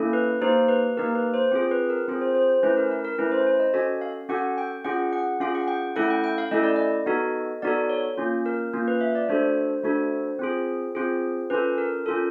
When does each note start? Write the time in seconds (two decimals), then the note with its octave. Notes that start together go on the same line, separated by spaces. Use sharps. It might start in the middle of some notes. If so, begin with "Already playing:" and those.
Already playing: A#3 C#4 E4 A4
0.13 B4
0.41 A#3 D#4 G4 C5
0.68 B4
0.97 A#3 D#4 G4 A#4
1.15 B4
1.34 C5
1.51 C4 F4 G#4
1.71 B4
1.90 A#4
2.08 C4 F4 G#4
2.21 C5
2.35 C5
2.49 C5
2.63 A3 C#4 E4 B4
2.77 A#4
2.91 A#4
3.04 A#4
3.18 A3 C#4 E4 B4
3.32 C5
3.47 C5
3.60 D#5
3.74 C#4 F#4 A4 D#5
4.01 F5
4.29 C#4 F#4 A4 F#5
4.58 G5
4.85 C#4 F4 G#4 F#5
5.13 F#5
5.40 C#4 F4 G#4 F5
5.55 F#5
5.68 G5
5.96 A3 C#4 E4 A4 F#5
6.10 G5
6.24 G5
6.38 F5
6.51 A3 C#4 E4 A4 D#5
6.63 D5
6.76 D#5
7.06 B3 D#4 F#4 A4
7.62 B3 D#4 F#4 A4 D5
7.89 C#5
8.18 A#3 C#4 F4
8.46 A#4
8.73 A#3 C#4 F4
8.88 B4
9.01 E5
9.15 D5
9.29 A3 D4 F#4 A4 C5
9.84 A3 D4 F#4 A4
10.39 C4 F4 G#4
10.95 C4 F4 G#4
11.50 C#4 F4 A4 B4
11.78 A#4
12.06 C#4 F4 A4